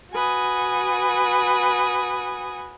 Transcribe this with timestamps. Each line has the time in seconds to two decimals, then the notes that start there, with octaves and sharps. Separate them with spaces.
0.13 F#4 B4 G#5 D#6